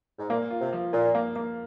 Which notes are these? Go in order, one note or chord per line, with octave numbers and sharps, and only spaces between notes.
G#2
A#2 A#3
F4
C3
F3
A#2 F4
A#3
A#3